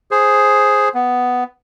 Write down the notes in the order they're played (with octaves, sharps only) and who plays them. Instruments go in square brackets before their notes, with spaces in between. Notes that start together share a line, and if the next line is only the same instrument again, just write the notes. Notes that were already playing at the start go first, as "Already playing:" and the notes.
[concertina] G#4 C5
B3